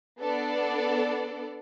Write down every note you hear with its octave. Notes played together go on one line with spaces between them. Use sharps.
B3 D4 A4 D5